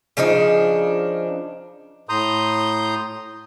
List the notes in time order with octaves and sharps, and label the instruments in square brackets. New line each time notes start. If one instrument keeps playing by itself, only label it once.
[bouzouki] C#3 F3 D4 D#4
[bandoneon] A2 A#5 C6 D#6 G6